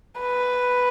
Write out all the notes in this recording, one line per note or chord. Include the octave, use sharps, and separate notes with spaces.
B4